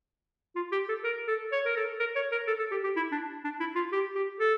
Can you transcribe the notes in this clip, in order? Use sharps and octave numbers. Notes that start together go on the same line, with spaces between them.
F4
G4
A4
A#4
A4
C#5
A#4
A4
A#4
C#5
A#4
A4
A4
G4
G4
E4
D4
D4
E4
F4
G4
G4
A4